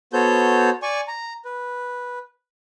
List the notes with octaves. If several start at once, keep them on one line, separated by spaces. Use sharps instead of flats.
B3 F#4 A4 C5 C#5 G6
D5 G#5 C#6
A#5
B4